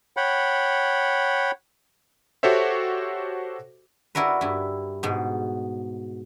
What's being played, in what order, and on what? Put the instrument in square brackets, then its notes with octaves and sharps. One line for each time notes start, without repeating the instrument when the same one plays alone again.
[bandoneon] C#5 F#5 G5 B5
[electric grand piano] F#4 G4 A4 C5 C#5 E5
[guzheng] D4 E4 F#4 A#4 B4
G2 E4
G#2 B2